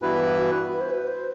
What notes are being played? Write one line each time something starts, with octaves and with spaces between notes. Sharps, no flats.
G2 E3 B3 E4 F#4 B4
F#4
B4
C5
B4
C5